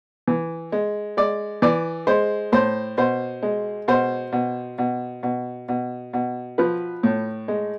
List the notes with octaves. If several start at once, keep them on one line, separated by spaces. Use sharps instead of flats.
E3
G#3
G#3 D5
E3 D5
G#3 C5
A2 C5
B2 C5
G#3
B2 C5
B2
B2
B2
B2
B2
F3 B4
A2
G#3